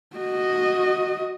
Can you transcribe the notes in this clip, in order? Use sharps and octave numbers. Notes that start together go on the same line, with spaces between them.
F#4 D#5